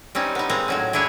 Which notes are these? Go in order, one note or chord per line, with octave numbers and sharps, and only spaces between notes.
G3 C4 C#4 D#4
B3 D#4
A#2 G#3 C4 G#5 A#5
A2 F#3 C#4
G#3 D4 E4 G#4 C#5